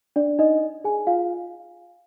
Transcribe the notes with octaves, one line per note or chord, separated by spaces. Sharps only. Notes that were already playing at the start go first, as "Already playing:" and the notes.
D4 D5
D#4 D#5
G#4 G#5
F4 F5